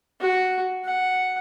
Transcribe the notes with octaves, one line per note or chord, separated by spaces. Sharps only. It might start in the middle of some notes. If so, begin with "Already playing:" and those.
F#4
F#5